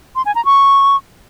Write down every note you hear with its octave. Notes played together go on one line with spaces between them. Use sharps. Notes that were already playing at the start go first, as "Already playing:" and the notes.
C6
G#5
A#5
C#6